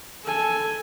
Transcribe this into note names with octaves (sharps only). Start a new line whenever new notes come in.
A4 G#5